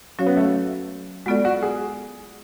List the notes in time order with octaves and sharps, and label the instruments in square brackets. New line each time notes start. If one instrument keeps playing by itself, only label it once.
[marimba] F#3 C#4 F#4 C#5 F5
[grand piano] B3
A3
[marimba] G#3 B3 F4 A4 D5 [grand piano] F#4
[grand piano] F#4
G#4